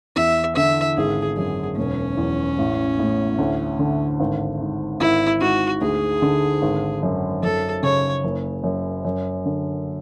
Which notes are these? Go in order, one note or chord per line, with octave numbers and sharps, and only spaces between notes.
E2 E5
D3 E5
G#1 G#4
F#2 G#4
E1 C#4
E2
A1
A2
D2
D3
G#1
G#2
G#1 E4
G#2 F#4
D2 G#4
D3
G#1
F#2
F#2 A4
C#3 C#5
F#1
F#2
F#2
D3